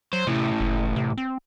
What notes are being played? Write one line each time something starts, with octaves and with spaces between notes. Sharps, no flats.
F#3 C5
A2 C3 E3
F#1
C3
C4